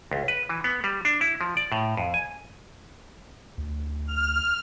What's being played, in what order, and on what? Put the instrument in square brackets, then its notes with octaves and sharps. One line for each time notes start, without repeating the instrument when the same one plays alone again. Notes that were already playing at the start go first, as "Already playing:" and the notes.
[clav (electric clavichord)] C#2
B4
E3
B3
G3
D4
E4
F3
D5
A2
F2
G#5
[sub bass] D2
[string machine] F6